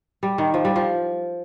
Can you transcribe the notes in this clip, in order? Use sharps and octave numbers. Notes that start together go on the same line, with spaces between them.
G3
D#3
F3
G3
F3